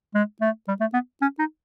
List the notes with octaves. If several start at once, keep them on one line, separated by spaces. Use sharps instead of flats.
G#3
A3
G3
A3
B3
C#4
D#4